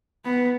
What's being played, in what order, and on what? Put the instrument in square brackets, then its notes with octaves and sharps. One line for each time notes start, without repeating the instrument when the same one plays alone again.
[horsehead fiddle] B3